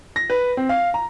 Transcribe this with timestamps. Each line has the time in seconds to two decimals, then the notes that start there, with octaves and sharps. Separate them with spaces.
0.16 A#6
0.30 B4
0.57 C4
0.69 F5
0.94 A#5